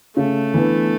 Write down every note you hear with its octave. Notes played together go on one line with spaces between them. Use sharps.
C#3 A3
E3 B3 D4